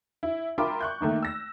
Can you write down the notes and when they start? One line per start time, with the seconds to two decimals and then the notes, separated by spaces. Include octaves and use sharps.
0.23 E4
0.58 F4 A#4 E5 G5 B5 D6
0.81 C#6 F#6 G6
1.01 D#3 A3 A#3 D#4
1.23 E6 A#6